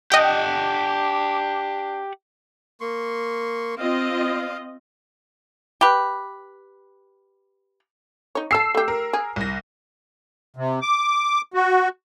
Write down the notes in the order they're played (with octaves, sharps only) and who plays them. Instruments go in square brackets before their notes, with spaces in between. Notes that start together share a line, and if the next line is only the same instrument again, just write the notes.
[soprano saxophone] D4 [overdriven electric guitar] G4 F#5 [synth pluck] D#5 G5
[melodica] A#3 C6 C#6
[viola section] C4 F4 D#5 [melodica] F5
[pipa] G4 B4
[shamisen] D#4 C#5
[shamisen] G#4 A4 [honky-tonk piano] E6 C7
[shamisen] A3 G4
[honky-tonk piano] A#4
[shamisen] G#4
[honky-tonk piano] C2 A#6
[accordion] C3
D6
F#4